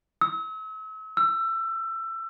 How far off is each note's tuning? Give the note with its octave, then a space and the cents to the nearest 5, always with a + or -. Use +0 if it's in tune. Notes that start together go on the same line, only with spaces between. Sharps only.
E6 -40
E6 +25